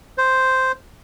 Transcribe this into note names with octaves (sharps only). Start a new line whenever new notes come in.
C5